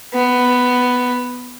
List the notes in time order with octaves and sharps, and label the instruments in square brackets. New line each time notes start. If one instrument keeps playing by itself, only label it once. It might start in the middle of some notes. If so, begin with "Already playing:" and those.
[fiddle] B3